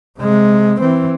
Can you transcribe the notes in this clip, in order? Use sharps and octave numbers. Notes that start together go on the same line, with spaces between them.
C3 G#3
E3 C4